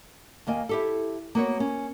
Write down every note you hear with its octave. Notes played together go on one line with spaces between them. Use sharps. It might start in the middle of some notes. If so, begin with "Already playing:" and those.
D#2 A#3 D#5 G#5
E4 G4 A4
A#3 B3 F#4 C#5
C#4